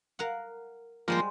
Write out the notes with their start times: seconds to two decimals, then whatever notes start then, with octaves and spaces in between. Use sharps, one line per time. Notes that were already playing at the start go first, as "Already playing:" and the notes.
0.19 A#4 F5 F#5
1.08 F3 G3 G#3 A#3 C5